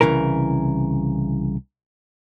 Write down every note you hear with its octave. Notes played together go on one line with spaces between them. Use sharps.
C2 C#3 E3 A#4